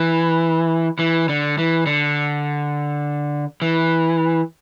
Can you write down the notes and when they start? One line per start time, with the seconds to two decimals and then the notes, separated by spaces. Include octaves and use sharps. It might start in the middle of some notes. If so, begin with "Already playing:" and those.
Already playing: E3
0.99 E3
1.29 D3
1.58 E3
1.86 D3
3.62 E3